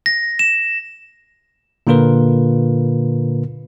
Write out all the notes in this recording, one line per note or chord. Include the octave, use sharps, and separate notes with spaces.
A#6
E7
A#2 D3 A#3 F4 A#4 B4